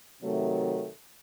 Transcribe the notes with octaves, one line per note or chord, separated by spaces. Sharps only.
C3 D#3 F#3 A3